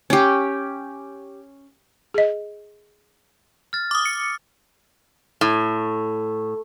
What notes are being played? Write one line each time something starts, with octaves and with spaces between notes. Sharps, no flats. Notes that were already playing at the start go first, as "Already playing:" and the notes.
C#4 G4
G#4 D#5
F6 A6
D6 D#6
C#7
A2